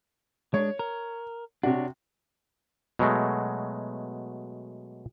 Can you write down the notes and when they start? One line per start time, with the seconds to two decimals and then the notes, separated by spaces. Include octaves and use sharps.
0.54 G#3 D4 C#5
0.79 A#4
1.63 C3 D4 F#4 C#5
2.99 B2 F#3 G#3 A3